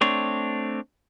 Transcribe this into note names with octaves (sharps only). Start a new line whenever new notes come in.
A3 C4 D4 C#5